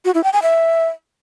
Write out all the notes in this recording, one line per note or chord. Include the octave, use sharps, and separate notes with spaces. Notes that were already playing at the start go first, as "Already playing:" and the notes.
F#4
E4
G5
G#5
E5